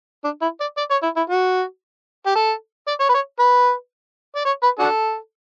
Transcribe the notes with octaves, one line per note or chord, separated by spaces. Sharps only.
D4
E4
D5
D5
C#5
E4
E4
F#4
G4
A4
D5
C#5
B4
C#5
B4
D5
C#5
B4
D4 F#4 A4